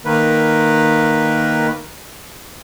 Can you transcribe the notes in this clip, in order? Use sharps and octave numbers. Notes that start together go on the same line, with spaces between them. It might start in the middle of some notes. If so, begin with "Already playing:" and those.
D#3 A#3 B4